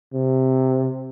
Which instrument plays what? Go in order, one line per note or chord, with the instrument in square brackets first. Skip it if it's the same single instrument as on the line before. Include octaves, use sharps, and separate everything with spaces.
[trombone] C3